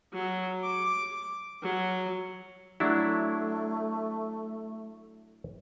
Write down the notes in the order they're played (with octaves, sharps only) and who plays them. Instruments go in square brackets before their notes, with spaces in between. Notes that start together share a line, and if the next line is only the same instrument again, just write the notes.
[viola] F#3
D6
F#3
[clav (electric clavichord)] F#3 D4 E4 [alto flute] A3